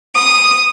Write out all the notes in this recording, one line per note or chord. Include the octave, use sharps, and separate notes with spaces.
D#6